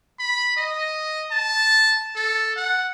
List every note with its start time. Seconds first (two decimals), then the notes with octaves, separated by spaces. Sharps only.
0.19 B5
0.56 D#5
1.31 A5
2.16 A4
2.56 F#5